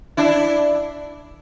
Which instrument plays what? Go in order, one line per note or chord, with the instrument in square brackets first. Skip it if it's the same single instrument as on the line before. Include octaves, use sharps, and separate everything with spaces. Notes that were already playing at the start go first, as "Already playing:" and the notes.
[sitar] D4 E4